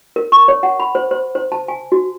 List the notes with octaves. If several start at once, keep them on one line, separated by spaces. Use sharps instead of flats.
A#4
C#6
C#5
F#5
B5
C5
C5
C5
A5
G#5
F#4